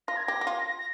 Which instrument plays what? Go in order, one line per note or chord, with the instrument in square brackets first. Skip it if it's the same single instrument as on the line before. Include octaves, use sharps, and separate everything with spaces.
[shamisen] F4 [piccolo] A#6
[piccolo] G#6
[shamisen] G4 [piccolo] A#6
[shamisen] G4
F4
[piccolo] A#6